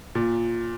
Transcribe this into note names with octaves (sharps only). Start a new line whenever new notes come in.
A#2